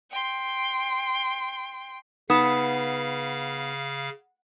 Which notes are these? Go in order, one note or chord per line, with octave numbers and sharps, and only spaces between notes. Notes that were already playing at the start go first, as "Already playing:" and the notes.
G5 C6
C#3 B3 D#4 F5 D#6 E7